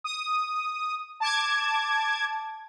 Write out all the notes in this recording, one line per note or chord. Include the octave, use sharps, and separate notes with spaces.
D#6
A5 D6 G#6